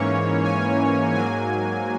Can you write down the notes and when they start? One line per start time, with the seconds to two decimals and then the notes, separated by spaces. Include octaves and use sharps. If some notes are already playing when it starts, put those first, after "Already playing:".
Already playing: G#2 E3 A#3 C#4 C#5
0.45 G#5
1.14 G#2 F#3 A#3 G#5